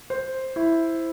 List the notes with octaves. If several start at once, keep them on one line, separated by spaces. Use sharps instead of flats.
C5
E4